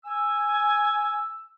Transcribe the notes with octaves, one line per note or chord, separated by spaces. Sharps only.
G#5 E6